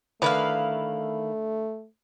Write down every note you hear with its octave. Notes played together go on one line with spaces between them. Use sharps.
D3 D#3 A3 E4 B4 F5